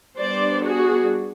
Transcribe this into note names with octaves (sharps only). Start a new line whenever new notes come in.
G3 B3 D4 C5 D5
F#4 G#4